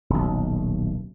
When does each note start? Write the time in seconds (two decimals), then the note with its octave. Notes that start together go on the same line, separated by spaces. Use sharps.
0.10 D#1 B1